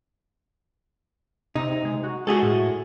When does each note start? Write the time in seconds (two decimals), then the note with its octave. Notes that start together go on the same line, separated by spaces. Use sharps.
1.56 C3 D#4
1.85 G#3
2.04 F#4
2.27 G#3 F#4 G#4 A4
2.43 A2